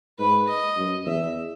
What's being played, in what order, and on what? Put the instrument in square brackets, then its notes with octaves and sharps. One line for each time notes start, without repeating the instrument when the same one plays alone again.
[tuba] G#2 [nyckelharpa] B4
[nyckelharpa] D#5
[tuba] F#2
[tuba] E2 [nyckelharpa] E5